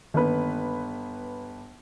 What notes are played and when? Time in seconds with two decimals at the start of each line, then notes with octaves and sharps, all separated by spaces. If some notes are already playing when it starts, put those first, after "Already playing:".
0.14 G1 D#3 A#3 C#4 B4